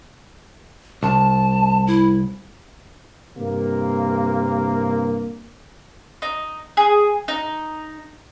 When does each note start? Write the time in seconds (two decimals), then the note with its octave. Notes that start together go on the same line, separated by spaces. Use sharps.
1.03 C2 A5
1.87 E4
3.37 G2 C3 A#3
6.22 D#4
6.77 G#4
7.28 D#4